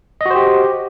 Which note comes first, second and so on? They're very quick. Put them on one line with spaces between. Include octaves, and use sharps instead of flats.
D#5 F#4 C5 G4